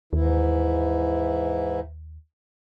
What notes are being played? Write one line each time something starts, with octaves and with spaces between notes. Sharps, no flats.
D#2 G#2 E3 E4